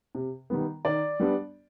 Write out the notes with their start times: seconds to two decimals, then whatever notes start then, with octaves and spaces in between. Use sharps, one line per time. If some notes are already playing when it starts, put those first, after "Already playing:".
0.15 C3
0.50 D#3 G3 B3
0.85 D#3 D5
1.20 G3 B3 D4